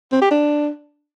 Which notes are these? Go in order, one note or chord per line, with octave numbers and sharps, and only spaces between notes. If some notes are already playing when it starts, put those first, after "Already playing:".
C4
G4
D4